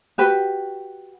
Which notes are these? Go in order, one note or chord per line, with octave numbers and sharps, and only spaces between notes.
F#4 G4 B4